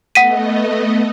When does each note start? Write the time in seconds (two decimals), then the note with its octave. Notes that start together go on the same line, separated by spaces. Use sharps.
0.15 A3 B3 D#5 F#5 B6 D#7